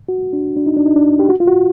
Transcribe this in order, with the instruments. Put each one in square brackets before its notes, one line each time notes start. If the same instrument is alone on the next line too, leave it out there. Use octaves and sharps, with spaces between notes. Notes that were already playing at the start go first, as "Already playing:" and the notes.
[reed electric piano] F#4
D4
D4
D#4
D4
D#4
D4
G4
F#4
F4
F#4